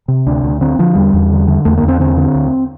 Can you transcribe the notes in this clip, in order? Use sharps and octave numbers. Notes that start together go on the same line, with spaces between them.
C3
D2 D4
D2
D3 C4
D3 F3
E2 G3
E2
D3
D3
E2 A3
A#3
E2
C4
D3 C4
D3
D2